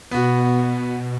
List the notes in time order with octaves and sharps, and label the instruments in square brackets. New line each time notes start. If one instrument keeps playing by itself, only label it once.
[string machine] B2 [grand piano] B3 F#4